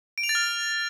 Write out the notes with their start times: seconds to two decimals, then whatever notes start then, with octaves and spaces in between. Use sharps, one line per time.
0.18 D7
0.23 F7
0.29 A6
0.35 F6